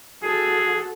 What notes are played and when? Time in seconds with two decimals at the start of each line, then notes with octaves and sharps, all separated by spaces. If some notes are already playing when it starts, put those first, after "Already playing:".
0.23 F#4 G#4 A4